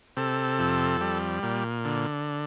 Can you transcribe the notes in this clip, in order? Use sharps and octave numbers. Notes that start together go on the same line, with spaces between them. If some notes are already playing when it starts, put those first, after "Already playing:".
C3 A4
F2
G3
A#2
D3